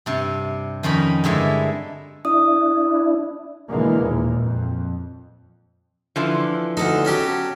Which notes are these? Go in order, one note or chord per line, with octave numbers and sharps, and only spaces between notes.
G2 C3
F2 D#3 C#4 A#4 B5
G2 D3 G#3 E4
D4 E4 D#6
B2 D3 E3 G#3 A#3
D#2 A#2
F2
D3 E3 F3
D2 C4 D#4 A4
F#3 C#4 G4